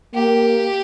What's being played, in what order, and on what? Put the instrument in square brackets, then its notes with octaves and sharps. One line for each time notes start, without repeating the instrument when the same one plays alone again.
[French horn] A#3 [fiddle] G4